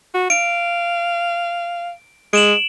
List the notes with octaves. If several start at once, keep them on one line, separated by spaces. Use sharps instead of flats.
F#4
F5 D7
G#3 D7 E7 F#7